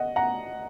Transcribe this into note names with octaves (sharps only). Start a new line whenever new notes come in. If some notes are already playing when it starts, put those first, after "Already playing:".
Already playing: D#5 F#5
F#5 A#5